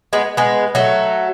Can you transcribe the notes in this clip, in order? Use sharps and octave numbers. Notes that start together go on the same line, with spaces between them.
G#3 B3
G#3 B3
F#3 A3